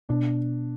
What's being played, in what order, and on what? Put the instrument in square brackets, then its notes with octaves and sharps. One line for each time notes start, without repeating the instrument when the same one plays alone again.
[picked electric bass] B2 [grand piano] D4